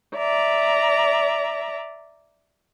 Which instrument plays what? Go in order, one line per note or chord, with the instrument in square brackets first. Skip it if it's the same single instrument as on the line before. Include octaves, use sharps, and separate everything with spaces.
[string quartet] D5 E5 A#5